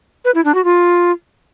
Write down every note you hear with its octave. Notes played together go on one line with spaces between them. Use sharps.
B4
E4
D4
F#4
F4